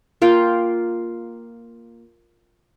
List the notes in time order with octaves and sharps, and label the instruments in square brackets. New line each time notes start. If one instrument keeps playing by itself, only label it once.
[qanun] A#3 F4 F5 G5